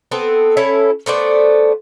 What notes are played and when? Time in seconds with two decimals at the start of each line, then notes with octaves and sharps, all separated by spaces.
0.11 B3 C4 A4
0.57 C#4 E4 A4
1.06 A3 B3 C5 D5